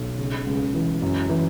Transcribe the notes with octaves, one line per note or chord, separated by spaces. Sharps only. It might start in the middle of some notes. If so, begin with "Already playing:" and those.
Already playing: B1
C#3
C#2
E3
F#2
E3